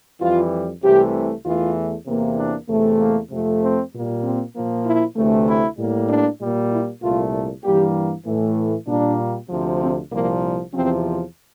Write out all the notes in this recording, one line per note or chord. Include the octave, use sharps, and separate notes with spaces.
F2 E3 G3 F4
C2 C3 E3 A3 G4
E2 E3 A3 F4
E2 C3 E3 A#3
D4
E2 C3 E3 A3
A#3
F2 C3 F3 A3
C4
A#2 G3 A#3
C4
A#2 F3 A#3
E4
D2 C3 E3 A3
E4
A2 G3 A#3
D4
A#2 G3 A#3
E4
C2 A#2 A3 F4
G2 E3 G3 A#3 G4
A2 E3 A3
A#2 G3 A#3 D4
D2 C3 F3
C4
C2 A#2 F3 A#3
E2 C3 F3 C4